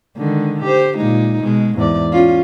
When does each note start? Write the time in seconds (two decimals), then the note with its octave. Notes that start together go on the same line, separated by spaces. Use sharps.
0.18 D3 D#3 G#3
0.63 G4 C5
0.98 A#2 G#3 D#4
1.43 B2 G#3
1.77 E2 G#2 D5
2.12 C#4 F4